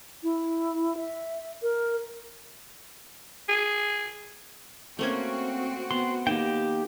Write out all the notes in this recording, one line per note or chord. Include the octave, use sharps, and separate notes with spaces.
E4
E5
A#4
G#4
A3 A#3 C4 C#4 F#4
B3 C6
D#3 A#3 G4 G5